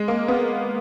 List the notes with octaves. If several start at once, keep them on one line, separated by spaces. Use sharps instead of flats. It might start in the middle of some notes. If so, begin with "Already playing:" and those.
Already playing: G#3
A#3
B3